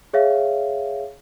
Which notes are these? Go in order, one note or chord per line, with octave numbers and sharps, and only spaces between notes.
G#4 C#5 E5 F5